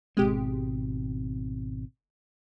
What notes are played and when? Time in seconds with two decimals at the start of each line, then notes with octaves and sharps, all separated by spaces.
0.17 G#1 B2 G#3 C4 G4